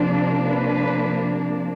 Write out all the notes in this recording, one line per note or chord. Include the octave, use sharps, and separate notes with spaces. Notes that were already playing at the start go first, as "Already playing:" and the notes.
Already playing: C3 F3 A#3 D4 C5
B4